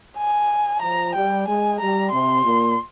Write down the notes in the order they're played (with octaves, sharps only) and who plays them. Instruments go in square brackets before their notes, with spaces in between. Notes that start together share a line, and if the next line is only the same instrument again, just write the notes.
[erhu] G#5
[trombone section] F3 [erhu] A#5
[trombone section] G3 [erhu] G5
[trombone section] G#3 [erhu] G#5
[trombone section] G3 [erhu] A#5
[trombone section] C3 [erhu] C6
[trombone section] A#2